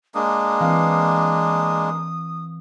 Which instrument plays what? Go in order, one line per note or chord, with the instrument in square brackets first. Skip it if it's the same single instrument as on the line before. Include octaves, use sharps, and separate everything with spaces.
[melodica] G#3 A#3 D4 [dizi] D#6
[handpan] E3 C4 F5